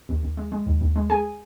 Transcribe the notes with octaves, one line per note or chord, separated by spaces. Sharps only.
D#2
D#2
G#3
G#3
D#2
D#2
G#3
G#3 G#4 G#5